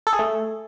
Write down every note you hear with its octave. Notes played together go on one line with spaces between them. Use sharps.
A4
G#4
A3